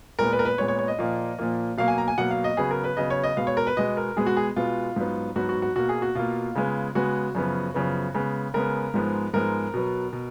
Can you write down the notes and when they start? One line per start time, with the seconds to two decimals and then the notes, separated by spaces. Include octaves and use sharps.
0.19 A#2 G#3 B3 A#4
0.32 B4
0.39 A#4
0.45 B4
0.58 A#2 G#3 B3 C#5
0.68 C#5
0.79 C#5
0.88 D#5
0.99 A#2 F3 A#3
1.39 A#2 F3 A#3
1.77 B2 F#3 A#3 F5
1.88 G#5
1.98 A#5
2.08 G#5
2.18 B2 F#3 A#3 F#5
2.31 F5
2.44 D#5
2.57 C#3 F#3 B3 G#4
2.71 A#4
2.84 B4
2.97 C#3 F#3 B3 D#5
3.10 C#5
3.24 D#5
3.37 B2 G#3 B3 F5
3.47 C#5
3.57 A#4
3.67 B4
3.77 B2 G#3 B3 D#5
3.97 A#4
4.16 B2 G#3 B3 G#4
4.26 F#4
4.37 G#4
4.56 B2 G#3 B3 F4
4.96 G#2 F#3 B3
5.36 G#2 F#3 B3 F#4
5.49 F#4
5.62 F#4
5.76 B2 A#3 F#4
5.89 G#4
6.02 F#4
6.15 B2 A#3 F4
6.55 C#3 G#3 B3
6.95 C#3 G#3 B3 F#4
7.35 F#2 C#3 F3 B3
7.74 F#2 C#3 F3 B3
8.15 C#3 G#3 B3
8.54 C#3 G#3 B3 A#4
8.94 G#2 F3 G#3 B3
9.34 G#2 F3 G#3 B3 A#4
9.74 B2 F#3 B3
10.13 B2